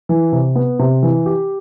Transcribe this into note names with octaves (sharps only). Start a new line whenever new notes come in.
E3
C3
B3
C3
E3
G4